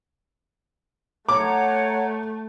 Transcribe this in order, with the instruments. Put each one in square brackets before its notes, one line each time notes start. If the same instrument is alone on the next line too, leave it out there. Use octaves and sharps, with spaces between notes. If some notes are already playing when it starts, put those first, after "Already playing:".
[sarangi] A3 [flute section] C#5 F#5 A#5 [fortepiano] D6